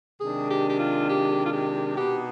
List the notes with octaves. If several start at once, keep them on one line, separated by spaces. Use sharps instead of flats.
C3 D#3 G#3 D4 G#4
G4
G4
F4
G4
F4
G4
B2 B3 D#4 G4